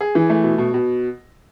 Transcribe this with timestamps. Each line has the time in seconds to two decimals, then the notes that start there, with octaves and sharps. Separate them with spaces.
0.01 G#4
0.15 E3
0.30 A3
0.43 B2
0.58 B2
0.74 B2